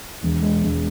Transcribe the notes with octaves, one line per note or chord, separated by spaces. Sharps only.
E1
G#3
E1